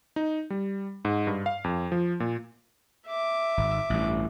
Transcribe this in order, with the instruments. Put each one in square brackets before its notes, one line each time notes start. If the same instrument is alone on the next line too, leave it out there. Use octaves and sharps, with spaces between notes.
[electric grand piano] D#4
G3
G#2
G2
F5
F2
F3
A#2
[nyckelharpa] E5 D6
[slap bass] G#1
A1 G2